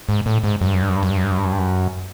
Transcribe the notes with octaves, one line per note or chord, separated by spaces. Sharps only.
G#2
A2
G#2
F#2
G2
F#2
G2
F#2
G2
F#2
G2
F#2
G2
F#2
G2
F#2
G2
F#2